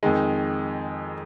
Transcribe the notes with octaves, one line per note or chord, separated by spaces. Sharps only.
F2 D#3 G#3 D#4